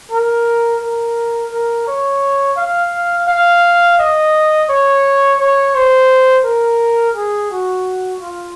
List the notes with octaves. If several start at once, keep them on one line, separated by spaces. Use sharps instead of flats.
A#4
A#4
A#4
C#5
F5
F5
D#5
C#5
C#5
C5
A#4
G#4
F#4
F4